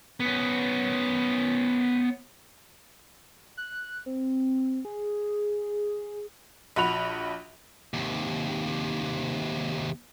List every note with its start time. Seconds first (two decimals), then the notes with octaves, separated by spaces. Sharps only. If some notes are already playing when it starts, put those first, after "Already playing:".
0.20 B3 C#4
3.57 F#6
4.06 C4
4.85 G#4
6.76 A#1 F#4 B5 F7
7.94 D#2 C3